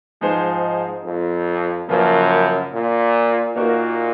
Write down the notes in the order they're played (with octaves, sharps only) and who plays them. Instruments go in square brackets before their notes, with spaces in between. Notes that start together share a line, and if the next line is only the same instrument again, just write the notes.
[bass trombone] G#2 [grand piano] F3 G#3 D#4 G#4 C5
[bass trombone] F2
[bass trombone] F#2 [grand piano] C#3 F3 A#3 F4 C5
[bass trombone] A#2
[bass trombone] A#2 [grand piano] A#3 D#4 F#4 A#4